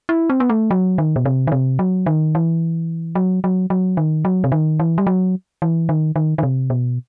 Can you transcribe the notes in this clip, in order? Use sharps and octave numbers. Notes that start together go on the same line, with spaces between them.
E4
C4
B3
A3
F#3
D#3
B2
C3
D#3
C3
F#3
D#3
E3
F#3
F#3
F#3
D#3
F#3
C3
D#3
E3
G3
F#3
E3
D#3
D#3
D#3
C3
B2